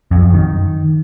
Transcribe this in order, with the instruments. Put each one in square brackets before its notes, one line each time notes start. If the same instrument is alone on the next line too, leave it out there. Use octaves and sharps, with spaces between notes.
[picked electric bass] F2
F#2
D#3